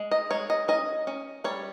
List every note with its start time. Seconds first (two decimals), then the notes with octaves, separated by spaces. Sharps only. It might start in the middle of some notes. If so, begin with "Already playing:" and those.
Already playing: G#3
0.11 D#5
0.31 G#3 C#5
0.50 D#5
0.68 C#4 D#5
1.07 C#4
1.44 G3 C#5